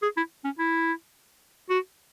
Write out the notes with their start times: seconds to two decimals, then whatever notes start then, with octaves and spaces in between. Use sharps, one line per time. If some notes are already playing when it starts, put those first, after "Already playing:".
0.02 G#4
0.17 E4
0.44 C#4
0.59 E4
1.70 F#4